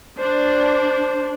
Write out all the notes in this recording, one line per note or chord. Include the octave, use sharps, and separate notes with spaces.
D4 C5